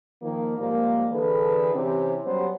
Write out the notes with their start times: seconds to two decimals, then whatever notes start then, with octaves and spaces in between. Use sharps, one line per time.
0.22 D#3 F3 A#3
0.58 G#2 F3 G3 A#3
1.13 D3 E3 G#4 A4 B4
1.75 C3 E3 C4 C#4 E4 G4
2.26 F#3 G3 B3 C#4 G4 C5